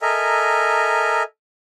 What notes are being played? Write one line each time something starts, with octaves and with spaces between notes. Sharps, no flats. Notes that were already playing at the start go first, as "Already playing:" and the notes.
A4 A#4 D#5 E5 G#5 A#5